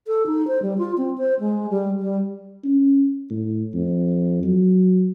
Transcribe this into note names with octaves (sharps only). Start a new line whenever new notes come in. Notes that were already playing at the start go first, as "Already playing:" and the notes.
A4
D#4
C5
G3
F4
C4
C5
G#3
G3
G3
C#4
A2
F2
F#3